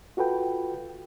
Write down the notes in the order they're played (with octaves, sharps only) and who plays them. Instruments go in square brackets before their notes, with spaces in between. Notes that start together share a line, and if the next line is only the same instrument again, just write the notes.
[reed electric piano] F4 F#4 A4 B4 G5